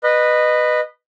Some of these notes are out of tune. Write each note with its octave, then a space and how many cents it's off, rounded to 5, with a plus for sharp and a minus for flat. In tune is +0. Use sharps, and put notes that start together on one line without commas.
B4 +0 D#5 -20